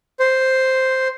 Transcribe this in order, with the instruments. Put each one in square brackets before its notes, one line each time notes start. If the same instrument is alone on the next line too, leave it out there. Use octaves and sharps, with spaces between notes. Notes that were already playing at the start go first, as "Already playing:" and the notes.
[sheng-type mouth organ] C5